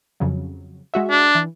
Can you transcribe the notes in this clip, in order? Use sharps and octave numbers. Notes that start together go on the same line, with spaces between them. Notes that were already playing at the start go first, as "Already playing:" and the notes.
F2 C#3 F#3
G#3 F#4 E5
D4
E3